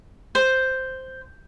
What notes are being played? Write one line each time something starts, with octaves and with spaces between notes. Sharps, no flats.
C5